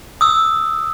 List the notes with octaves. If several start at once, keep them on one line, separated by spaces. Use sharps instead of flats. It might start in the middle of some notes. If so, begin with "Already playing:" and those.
D#6 E6